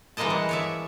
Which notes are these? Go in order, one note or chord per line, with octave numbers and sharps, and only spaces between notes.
E3 G3 G#3 A#3 D#5 A5
F#5
C#5 D5 E5